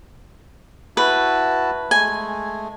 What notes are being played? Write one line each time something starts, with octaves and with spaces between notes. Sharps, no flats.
E4 F#4 B4 A5
G#3 A3 G#5